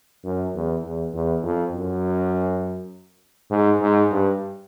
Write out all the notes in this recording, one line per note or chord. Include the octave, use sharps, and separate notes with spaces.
F#2
E2
E2
E2
F2
F#2
G#2
G#2
G2